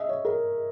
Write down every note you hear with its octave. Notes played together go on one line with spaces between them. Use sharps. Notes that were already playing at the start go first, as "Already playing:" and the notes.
Already playing: D#5 E5
C#5
A#4